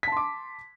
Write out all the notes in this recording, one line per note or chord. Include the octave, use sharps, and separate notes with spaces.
A5 C6 D6 B6